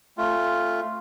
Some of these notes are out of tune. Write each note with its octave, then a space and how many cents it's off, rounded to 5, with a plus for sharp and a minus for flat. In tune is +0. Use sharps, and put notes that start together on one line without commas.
A3 +0 C4 +45 F4 +0